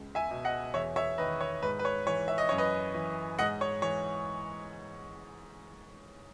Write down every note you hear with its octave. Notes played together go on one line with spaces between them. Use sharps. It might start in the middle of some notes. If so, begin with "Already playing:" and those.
Already playing: C#2
E5 G#5
B2
D#5 F#5
E2 C#5 E5
C#5 E5
D#3 B4 D#5
C#5
G#2 B4
B4
C#5
E3 C#5
E5
D#5
F#2 C#5
B4 D#5
E3
G#2 D#5 F#5
C#5
E3 C#5